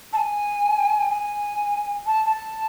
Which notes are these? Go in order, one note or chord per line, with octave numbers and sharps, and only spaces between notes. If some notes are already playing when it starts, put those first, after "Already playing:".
A5
G#5
G#5
A5
A5